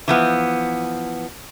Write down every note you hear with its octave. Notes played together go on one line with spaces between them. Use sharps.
E3 F3 B3